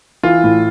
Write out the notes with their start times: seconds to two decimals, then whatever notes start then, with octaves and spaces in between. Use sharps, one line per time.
0.23 E3 F4
0.44 A2